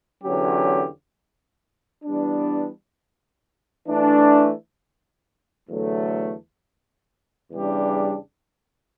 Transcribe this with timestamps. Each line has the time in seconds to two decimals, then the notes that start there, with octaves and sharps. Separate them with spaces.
0.23 E2 D3 F#3 C#4 G4
2.05 E3 G3 B3 D4
3.87 E3 A3 D4
5.69 E2 D3 F#3 A3
7.52 E2 C#3 G3 D4 G4